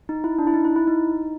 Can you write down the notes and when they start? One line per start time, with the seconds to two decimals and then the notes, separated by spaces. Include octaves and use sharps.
0.09 D#4
0.24 E4
0.38 D4
0.47 E4
0.54 D#4
0.65 E4
0.76 E4
0.88 D#4